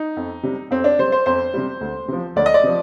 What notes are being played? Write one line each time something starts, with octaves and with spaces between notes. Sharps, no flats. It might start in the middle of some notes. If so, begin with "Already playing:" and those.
Already playing: D#4
F2
C3 G3
F2 C4
D4
C3 G3 C5
C5
F2 C5
C3 G3
D2
C3 F3
D2 D5
D#5
D5
C3 F3